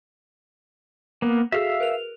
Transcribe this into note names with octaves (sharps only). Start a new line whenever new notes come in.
A#3 B3
F#4 G#4 A4 E5 F5 E6
A#4 B4 F7